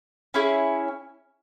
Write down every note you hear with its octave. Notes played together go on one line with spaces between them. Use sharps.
C#4 E4 G#4